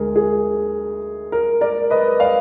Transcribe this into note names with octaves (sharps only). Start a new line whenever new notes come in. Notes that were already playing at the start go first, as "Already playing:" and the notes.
Already playing: D2 D3 G#3 G#4 A#4
G#4
A#4
A#4 D5
B4 D#5
D5 F5